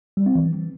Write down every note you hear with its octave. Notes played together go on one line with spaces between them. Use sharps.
G3
C4
E3